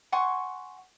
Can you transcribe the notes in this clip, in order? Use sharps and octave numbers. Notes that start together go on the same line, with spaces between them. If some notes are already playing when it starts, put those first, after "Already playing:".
F#5 G#5 C6 C#6